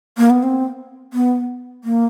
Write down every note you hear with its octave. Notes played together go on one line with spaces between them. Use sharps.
A#3
B3
C4
B3
A#3